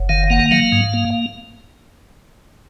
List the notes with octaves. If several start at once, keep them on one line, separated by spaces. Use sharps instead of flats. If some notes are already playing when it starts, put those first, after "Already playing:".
Already playing: F#1
D#3 F5
A#3 F#5
F#3 F5
G#2
A#3